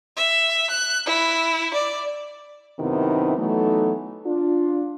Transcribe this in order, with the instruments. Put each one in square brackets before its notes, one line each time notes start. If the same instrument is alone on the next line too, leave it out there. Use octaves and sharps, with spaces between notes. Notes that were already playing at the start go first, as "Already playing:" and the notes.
[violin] E5
F#6
E4
D5
[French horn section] F#2 C3 D#3 B3 D#4 E4
E3 F#3 A3 B3 D#4 A4
D4 F4